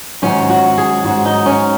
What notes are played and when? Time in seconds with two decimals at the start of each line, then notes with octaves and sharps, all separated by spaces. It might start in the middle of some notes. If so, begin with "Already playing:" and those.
0.22 G#2 D#3 F#3 C#4
0.50 F#4
0.78 G#4
1.04 G#2 F#3 F#4
1.25 D#4
1.46 C#4